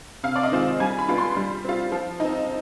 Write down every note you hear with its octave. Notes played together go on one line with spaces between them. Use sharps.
C3 F5
D5
D#5
D#3 G#3 C4 F4
G3 G#5
B5
B3 D4 F4
C6
G3
C4 F4
F3
C4 D#4